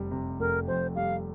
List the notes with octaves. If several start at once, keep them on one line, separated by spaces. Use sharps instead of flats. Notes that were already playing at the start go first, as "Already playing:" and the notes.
Already playing: F1 F2 C3 G3
C3
F1 A#4
F2 C5
G3 F5